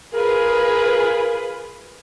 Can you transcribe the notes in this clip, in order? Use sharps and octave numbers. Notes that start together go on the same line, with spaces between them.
F4 G#4 A#4 B4